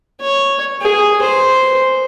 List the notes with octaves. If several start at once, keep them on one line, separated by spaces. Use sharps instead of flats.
C#5
G#4
C5